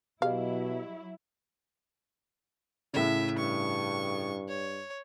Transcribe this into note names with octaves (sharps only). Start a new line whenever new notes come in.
B2 F#3 E4 G4 G#4 D#5 F5
A2 C#3 E5
G2 C#6
C#5